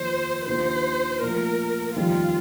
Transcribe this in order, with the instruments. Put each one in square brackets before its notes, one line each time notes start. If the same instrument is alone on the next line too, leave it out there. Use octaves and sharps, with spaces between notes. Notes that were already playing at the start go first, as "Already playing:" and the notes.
Already playing: [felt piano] F1 D#2 D#3 A#3 F4 [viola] C5
[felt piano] D#2 D#3 A#3 D4 F4 [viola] C5
[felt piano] A#2 F3 A3 [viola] A#4
[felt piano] F1 D#2 D#3 G3 C4 [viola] F4